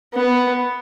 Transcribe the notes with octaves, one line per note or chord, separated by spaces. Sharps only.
B3